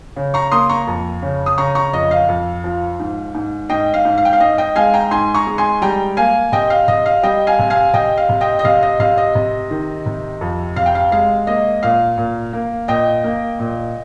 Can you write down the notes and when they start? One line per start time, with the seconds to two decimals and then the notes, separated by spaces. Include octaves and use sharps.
0.16 C#3
0.34 A#5 C#6
0.52 A#3 C6 D#6
0.69 A#5 C#6
0.87 F2
1.22 C#3
1.46 D#6
1.58 C#3 A#5 C#6
1.75 A#5 C#6
1.93 F2 D#5
2.11 F5
2.29 F2
2.64 F3
3.00 G#2
3.35 G#2
3.69 G#2 D#5 G5
3.94 F5
4.05 G#2
4.18 F5
4.25 G5
4.33 F5
4.40 G#2 D#5
4.58 D#5 G5
4.76 G#3 F5 G#5
4.94 G5 A#5
5.11 G#2 G#5 C6
5.34 A#5 C#6
5.47 G#3
5.58 G#5 C6
5.82 G3 G5 A#5
6.17 A#3 F5 G#5
6.52 C3 D#5 G5
6.70 F5
6.88 C3 D#5
7.06 F5
7.23 G3 D#5 G5
7.47 F5 G#5
7.59 C3
7.70 F5 G#5
7.94 C3 D#5 G5
8.17 F5
8.29 C3
8.41 D#5 G5
8.59 D#5
8.65 C3 F5
8.82 D#5
9.00 C3 F5
9.18 D#5
9.35 C3
9.70 D#3
10.06 C3
10.41 F2
10.76 C3 F5
10.86 G5
10.95 F5
11.12 G#3 F5
11.47 A#3 D#5
11.83 A#2 F5
12.18 A#2
12.53 A#3
12.88 A#2 D#5 G5
13.24 A#3
13.59 A#2